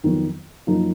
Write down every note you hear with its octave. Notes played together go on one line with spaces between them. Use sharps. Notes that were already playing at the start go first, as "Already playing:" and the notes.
F2 D#3 F#3 B3
F#2 F3 A#3 D#4